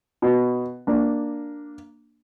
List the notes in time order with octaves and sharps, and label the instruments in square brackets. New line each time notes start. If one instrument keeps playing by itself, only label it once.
[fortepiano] B2
A#3 D4